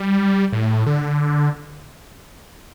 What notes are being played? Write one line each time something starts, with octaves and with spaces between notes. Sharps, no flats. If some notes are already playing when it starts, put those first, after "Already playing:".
Already playing: G3
A2
D3